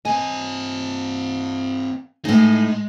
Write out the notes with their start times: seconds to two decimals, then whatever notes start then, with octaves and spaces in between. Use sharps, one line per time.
0.05 C4 D#5 G#5
2.25 A2 G#3 D#4